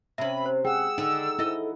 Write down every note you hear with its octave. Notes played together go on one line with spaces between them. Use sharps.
C3 C#4 E5 B5
C5
G#4 F#5 G5 E6
D3 D#4 F#5
E4 A4 D#5